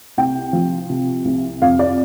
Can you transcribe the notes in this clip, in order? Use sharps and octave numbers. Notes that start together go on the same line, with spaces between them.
C2 G5
F3
C3
C2
F2 F5
D5